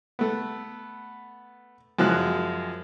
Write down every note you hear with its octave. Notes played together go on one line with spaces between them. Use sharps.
A3 B3
F#2 F3 G#3 F#6